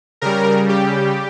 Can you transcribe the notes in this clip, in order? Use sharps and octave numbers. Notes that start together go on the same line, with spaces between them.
C#3 G3 A#4
G4